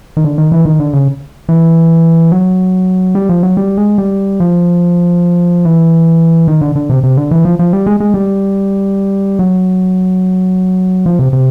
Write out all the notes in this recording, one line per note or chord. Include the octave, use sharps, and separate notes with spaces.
D#3
D3
D#3
E3
D#3
D3
C#3
E3
F#3
G3
F3
F#3
G3
G#3
G3
F3
E3
D#3
D3
D3
C3
C3
D3
E3
F3
F3
G3
G#3
G#3
G3
F#3
F3
C3
C3